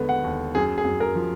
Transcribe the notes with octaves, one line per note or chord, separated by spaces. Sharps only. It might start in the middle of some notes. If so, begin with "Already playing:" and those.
Already playing: D#2 D3 G#3 B3
F#5
D#2
F#2 G#4
G#4
F#2
A#4
F3